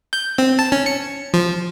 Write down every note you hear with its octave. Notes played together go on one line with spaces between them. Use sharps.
G6
C4
A5
C#4
C#7
F3